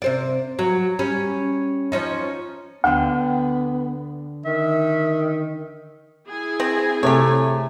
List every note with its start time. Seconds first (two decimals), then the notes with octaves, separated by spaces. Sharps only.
0.02 C3 C5 D5
0.59 F#3
0.99 G3 C#4
1.92 F3 C#4 D#4
2.84 D2 D3 B3 D4 G5
4.45 D#3 E5
6.27 E4 G#4 G#5
6.60 C4
7.03 C3 A3 G4 C#5